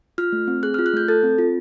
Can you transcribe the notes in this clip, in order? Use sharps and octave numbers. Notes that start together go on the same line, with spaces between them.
F4 F6
A3
C4
G#4 F#6
F4 F6
F#6
A3 G6
A4 A6
C4
F4